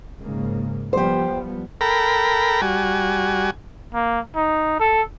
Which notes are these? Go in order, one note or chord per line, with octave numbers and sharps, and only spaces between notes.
G#2 C#3 A#3
F3 G3 B3 G4 C5
A4 A#4 G5 A#5 B5
G3 F#4 G#5
A#3
D#4
A4